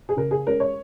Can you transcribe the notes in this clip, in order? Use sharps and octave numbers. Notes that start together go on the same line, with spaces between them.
G#4
C#3 A#4
G#4
G#3 C#4 A#4
C#5